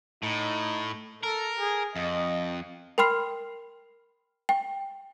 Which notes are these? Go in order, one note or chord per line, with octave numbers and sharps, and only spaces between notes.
A2 D#4
A4 A#4
G#4
F2 D#5
A#4 G5 B5 C6 F6 C7
G5